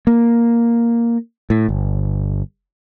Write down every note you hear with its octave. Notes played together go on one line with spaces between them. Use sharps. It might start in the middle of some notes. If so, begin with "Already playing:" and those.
A#3
A2
G1